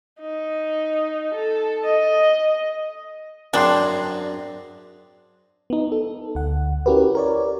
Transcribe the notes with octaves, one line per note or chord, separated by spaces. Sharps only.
D#4
A4
D#5
F#2 C4 D4 G#4 F#5 G5 C6
B3 D#4
A4
D2 F#5
C#4 E4 F#4 G4 A#4 B4
A#4 C#5 D5